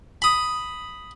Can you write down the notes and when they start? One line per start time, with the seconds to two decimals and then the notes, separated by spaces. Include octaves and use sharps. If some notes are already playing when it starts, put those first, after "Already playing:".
0.22 B5 D#6